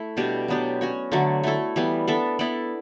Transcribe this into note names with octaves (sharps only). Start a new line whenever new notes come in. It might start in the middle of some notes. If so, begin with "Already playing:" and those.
Already playing: A3 E4
B2 G3 D4 G4
F#3 B3 D4 G4
C#4 F#4 C#5
D3 F#3 A3
A3 E4 A4
E3 G3 B3
B3 D4 A4 E5
B3 E4 A4 D5